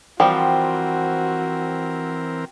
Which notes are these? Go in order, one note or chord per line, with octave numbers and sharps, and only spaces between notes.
E3 F3 G3 C4 F#4 A#4 G5